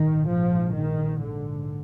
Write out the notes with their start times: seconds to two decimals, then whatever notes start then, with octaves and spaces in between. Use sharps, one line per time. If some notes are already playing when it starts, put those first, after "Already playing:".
Already playing: A#1 G#2 D#3
0.27 F3
0.73 D#3
1.20 D3